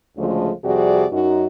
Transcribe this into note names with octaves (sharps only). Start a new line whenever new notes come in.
D2 C#3 F3 G#3 A3
F2 C3 G3 F#4 G#4 D5
F#2 D#4 F#4